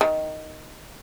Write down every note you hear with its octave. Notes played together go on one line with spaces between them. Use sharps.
D#3